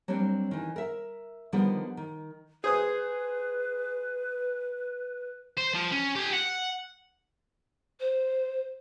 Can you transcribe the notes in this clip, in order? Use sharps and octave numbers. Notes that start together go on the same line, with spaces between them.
F#3 G3 A#3 C4 D4
D#3 E3
A#4 E5
D3 D#3 F3 G3 B3
D#3
G#4 B4 C5 D#6
C5
F3
C#4
G4 G#5
F#5
C5